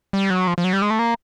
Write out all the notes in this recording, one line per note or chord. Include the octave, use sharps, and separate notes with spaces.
G3
F#3
F3
F3
F#3
G3
G#3
A3
A#3